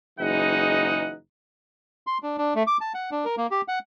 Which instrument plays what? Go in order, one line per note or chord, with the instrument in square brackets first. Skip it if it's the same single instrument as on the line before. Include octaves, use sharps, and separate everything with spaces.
[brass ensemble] F#1 E3 G#3 D#4 D#5 F#5
[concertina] C6
D4
D4
A3
D6
A5
F#5
D4
A#4
A#3
G4
F#5